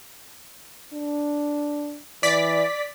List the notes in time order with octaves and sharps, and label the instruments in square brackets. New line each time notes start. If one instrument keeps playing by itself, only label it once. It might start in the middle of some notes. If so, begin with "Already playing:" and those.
[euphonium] D4
[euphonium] E3 [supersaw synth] D5 B6